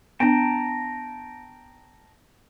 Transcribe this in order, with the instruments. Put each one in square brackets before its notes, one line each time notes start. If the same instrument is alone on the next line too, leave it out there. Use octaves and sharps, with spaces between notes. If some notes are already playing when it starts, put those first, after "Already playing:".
[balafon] B3 D4 [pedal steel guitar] G5 A5 A#5